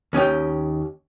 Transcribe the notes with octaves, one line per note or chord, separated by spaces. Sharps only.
D#2 C#4 D#5 G5